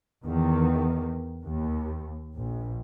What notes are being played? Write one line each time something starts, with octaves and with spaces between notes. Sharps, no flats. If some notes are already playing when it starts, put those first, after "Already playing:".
E2 D#3
D#2
A#1